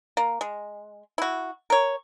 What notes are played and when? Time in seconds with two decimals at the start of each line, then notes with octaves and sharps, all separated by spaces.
0.17 A#3
0.41 G#3
1.18 E4 F#4
1.70 A#4 C#5